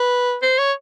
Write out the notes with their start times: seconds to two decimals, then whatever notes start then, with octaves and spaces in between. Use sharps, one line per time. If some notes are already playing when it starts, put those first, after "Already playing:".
Already playing: B4
0.42 C5
0.58 C#5